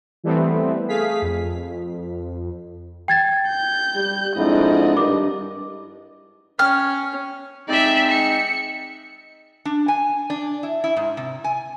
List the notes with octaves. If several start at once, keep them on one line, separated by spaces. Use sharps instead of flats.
E3 G3 A3 B3 C4
A3 G#4 F5 B6
F2
G5 G#6 A6
G6
G3
F2 G#2 D4 E4 D#5
G2 D#3 D6
C#4 G5 F6
G#3 C4 D#4 D5 E5
C#7
D4
G#5
D4
E4
E4
G#2
C3
G#5